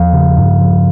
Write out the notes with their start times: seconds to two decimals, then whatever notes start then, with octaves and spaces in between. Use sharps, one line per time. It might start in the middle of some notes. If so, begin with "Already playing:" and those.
Already playing: E2 F3 F5
0.13 C#3
0.38 G2
0.61 F3